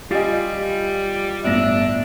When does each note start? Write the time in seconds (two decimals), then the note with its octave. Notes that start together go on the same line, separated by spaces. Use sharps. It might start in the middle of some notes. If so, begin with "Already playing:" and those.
0.11 G3 F4 G4 D#5 F5 G#5 A6
1.44 G1 A2 D4 E5 A#6